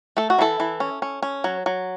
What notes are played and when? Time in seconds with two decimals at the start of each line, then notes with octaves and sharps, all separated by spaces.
0.17 A3 A4
0.30 F#4
0.39 E3 E4 A4
0.60 E3
0.80 C#4
1.02 C#4
1.22 C#4
1.44 F#3
1.66 F#3